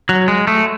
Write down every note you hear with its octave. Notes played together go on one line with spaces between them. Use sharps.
F#3
G#3
A3